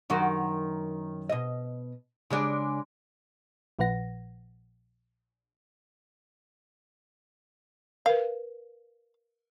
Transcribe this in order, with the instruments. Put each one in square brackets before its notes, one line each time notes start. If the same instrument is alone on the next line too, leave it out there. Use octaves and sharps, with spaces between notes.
[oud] F#2 D#3 F#4
B2 D#5
C#3 G#3 D4
[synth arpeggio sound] A#1 A#2 F3 B4 F#5 A#6
[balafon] A#4 B4 [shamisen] F5